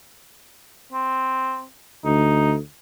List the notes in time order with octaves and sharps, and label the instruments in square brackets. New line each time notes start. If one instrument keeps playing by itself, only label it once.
[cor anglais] C4
[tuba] D2 [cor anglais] D#4